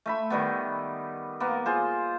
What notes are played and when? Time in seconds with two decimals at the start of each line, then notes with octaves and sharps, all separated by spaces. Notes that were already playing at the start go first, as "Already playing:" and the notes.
0.06 A3 E5 B5
0.30 D#3 G3 B3
1.40 A#3 B3
1.66 F4 G#4 C5